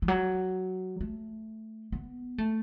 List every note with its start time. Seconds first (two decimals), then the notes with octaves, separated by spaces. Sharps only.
0.02 E3
0.08 F#3
1.01 A3
1.92 B3
2.38 A3